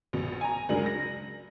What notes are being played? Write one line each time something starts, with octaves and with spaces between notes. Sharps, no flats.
A#1 B2
G#5 A#5
C#2 F#3 G#3 D4 A#4 F#7
A#6